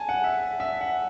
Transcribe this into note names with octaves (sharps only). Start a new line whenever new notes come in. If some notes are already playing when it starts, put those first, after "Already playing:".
Already playing: G#5 A5
F#5
E5
E5
F#5